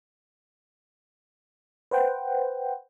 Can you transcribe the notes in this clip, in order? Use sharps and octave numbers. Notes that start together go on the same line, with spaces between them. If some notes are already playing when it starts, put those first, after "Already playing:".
B4 C5 F#5 G5